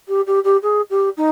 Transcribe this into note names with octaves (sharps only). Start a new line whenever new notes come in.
G4
G4
G4
G#4
G4
D#4